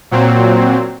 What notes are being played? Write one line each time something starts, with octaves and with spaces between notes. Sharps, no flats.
A#2 F#3 C4